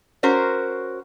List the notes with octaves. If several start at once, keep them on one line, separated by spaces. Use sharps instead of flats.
C#4 F#4 A#4 C5